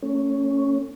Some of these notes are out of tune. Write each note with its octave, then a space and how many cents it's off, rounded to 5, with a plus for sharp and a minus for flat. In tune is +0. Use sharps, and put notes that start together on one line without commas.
A3 +45 C#4 +0